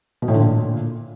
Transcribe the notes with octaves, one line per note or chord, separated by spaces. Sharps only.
B2
A2
D3
A#2